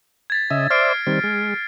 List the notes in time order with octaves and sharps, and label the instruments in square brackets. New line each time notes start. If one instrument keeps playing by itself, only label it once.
[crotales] G#6 A6 B6
[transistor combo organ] C#3 D#5 E5
[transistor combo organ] C5 D5 E5 [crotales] F6 C7 D7
[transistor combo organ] D#3 G3 C4
G#3